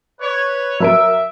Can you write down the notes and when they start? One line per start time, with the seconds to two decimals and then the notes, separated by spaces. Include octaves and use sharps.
0.20 B4 C#5
0.80 F#3 A#4 E5 D7